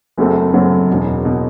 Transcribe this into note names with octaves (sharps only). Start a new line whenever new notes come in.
F#1 F#2 F#3 A3 C4
F#1 F#2 F#3 A3 C4
E1 E2 B2
B2